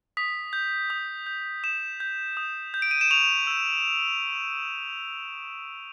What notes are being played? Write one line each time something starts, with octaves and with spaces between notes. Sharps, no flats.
D#6 B6
G6
D#6
G6
D#6 E7
G6
D#6
G6
D7
D#7
E7
C#6 F7
E6 G6